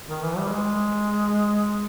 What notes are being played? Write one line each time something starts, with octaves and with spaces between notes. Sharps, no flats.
D#3
E3
G3
G#3